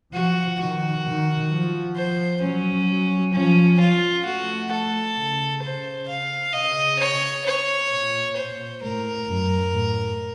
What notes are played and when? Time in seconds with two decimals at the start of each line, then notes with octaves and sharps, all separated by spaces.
0.13 F3 F#4
0.59 D#3 F#4
1.05 D#3
1.51 F3
1.96 C5
2.42 F#3 C#4
2.88 F#3
3.33 F3 C#4
3.79 F3 F4
4.25 A3 F#4
4.71 A4
5.16 C#3
5.62 C5
6.08 F5
6.53 C#3 D#5
6.99 C#5
7.46 C#5
7.91 A#2
8.36 C5
8.82 A2 A#4
9.28 F#2
9.74 A2